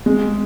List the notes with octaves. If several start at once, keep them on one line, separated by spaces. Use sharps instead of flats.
G#3